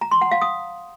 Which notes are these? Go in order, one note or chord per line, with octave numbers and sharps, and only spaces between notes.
A#5
C6
F#5
F5
D#6